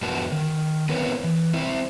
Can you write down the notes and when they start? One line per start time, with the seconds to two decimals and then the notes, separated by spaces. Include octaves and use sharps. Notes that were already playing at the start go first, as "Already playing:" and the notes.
0.02 F2 B3 F#4 G4 A#4 A5
0.32 D#3
0.89 B3 C4 E4 A#4 B4 C#5
1.24 E3
1.53 C4 E4 C5